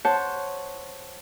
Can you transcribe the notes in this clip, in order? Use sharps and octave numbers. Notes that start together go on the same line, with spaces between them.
C5 C#5 F#5 A5